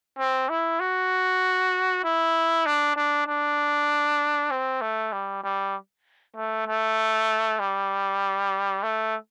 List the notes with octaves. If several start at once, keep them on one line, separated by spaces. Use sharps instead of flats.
C4
E4
F#4
E4
D4
D4
D4
C4
A3
G3
G3
A3
A3
G3
A3